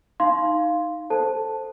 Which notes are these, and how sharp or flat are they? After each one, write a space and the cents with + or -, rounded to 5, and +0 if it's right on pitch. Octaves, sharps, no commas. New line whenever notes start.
D#4 +0 F5 +0 C6 +0
A4 +0 C5 +0 A5 +0